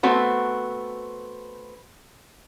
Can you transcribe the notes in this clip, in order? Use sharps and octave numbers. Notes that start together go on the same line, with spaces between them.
A3 B3 C4 F#4